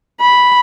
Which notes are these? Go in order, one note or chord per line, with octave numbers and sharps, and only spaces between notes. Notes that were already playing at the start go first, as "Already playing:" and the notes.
B5